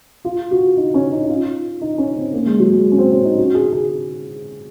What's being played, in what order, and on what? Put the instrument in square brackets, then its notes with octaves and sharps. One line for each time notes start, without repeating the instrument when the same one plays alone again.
[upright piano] F4
F#4
D#4
C#4
D#4
D#4
F4
D#4
C#4
C4
A#3
G#3
F#3
G#3
C#4
C4
C#4
D#4
F#4
G#4
G#4